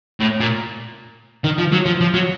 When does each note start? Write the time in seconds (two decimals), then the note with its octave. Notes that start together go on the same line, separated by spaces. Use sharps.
0.20 A2
0.40 A#2
1.44 D#3
1.58 F3
1.72 F#3
1.86 F3
2.01 F3
2.14 F#3